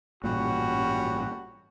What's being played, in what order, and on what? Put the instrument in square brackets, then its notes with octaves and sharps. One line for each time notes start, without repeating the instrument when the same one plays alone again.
[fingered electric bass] A1 G2 A#2 [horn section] G3 C#4 F#4